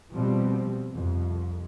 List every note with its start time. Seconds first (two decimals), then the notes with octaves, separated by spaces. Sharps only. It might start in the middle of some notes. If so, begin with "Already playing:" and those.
0.12 B2 F3 G3 C4
0.92 C2 F2